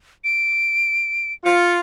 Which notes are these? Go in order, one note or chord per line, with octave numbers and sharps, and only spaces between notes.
D7
F4 C#7